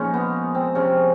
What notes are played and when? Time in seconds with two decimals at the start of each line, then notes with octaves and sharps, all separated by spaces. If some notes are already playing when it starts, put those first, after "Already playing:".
Already playing: A#2 F3 G#3 C#4 D#4
0.14 B3
0.55 C4
0.75 C3 F3 G#3 C#4